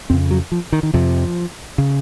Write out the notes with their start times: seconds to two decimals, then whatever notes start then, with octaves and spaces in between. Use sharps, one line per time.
0.10 F2 C#3 C4
0.31 F#3
0.52 F3
0.72 D#3
0.83 D#3
0.93 F2 C3 F3
1.78 C#3